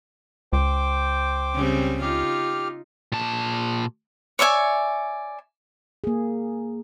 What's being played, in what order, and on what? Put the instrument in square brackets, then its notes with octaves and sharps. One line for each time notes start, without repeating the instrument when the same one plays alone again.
[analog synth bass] C#2 [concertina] C5 G5 D6
[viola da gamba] C#3 G3 C4
[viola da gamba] D#4 F4 [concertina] G4 F6
[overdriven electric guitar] A#2 A5
[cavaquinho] C#5 D5 E5 G#5
[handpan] A#3 G#4